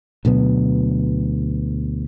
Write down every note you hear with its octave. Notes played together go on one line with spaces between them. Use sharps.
D2 B2 F#3 B3